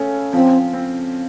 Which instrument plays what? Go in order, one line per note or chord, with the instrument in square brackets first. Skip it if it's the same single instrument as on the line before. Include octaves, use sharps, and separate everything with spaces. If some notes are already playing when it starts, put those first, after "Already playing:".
Already playing: [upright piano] C#3 A3 C#4
[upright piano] F3 [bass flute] C4
[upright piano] C4